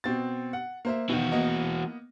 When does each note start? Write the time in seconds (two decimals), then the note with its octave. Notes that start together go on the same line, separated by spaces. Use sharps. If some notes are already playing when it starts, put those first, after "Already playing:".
0.04 B2 C4 A6
0.53 F#5
0.85 A#3 C5 E5
1.09 B2 D#3 E3 F#4
1.32 A#3 B3 D#5